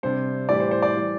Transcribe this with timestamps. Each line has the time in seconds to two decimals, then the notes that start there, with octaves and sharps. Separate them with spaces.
0.03 C3 G3 D4 C5
0.48 A2 E3 G3 E4 G4 D5
0.60 C5
0.71 C5
0.82 D5
0.95 E3 G3